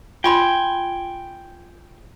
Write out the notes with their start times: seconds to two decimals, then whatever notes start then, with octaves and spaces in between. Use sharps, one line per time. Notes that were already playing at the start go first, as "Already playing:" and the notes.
0.24 F4 G5 G#5 B5 C6